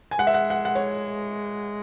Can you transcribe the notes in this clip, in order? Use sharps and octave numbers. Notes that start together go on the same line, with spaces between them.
G#5
G#3 F#5
E5
F#5
F#5
F#5
C#5